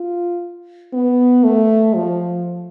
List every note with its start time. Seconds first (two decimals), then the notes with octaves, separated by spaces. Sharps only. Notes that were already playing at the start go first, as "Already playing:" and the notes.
Already playing: F4
0.93 B3
1.44 A3
1.95 F3